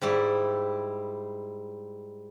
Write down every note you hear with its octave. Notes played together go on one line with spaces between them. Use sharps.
G#2 G3 E4